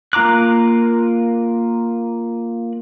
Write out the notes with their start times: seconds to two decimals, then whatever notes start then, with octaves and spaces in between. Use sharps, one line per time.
0.13 A#3 F4 A#5 D6 F#6